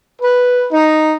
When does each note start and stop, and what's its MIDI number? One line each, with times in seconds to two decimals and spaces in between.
0.21 0.65 71
0.71 1.15 63